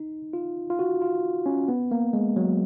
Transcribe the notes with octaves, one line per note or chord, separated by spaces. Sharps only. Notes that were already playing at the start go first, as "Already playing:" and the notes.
Already playing: D#4
F4
F4
F#4
F4
C#4
B3
A#3
G#3
F#3